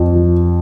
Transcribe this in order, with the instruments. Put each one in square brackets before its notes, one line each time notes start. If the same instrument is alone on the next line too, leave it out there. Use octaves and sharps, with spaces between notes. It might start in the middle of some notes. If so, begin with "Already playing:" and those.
Already playing: [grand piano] F2 F3
F3